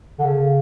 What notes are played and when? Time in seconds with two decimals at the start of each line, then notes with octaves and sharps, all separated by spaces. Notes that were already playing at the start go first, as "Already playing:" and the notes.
0.19 D3
0.24 C#3